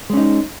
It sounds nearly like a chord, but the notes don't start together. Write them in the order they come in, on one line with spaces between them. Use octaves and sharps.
G#3 C#4 D#4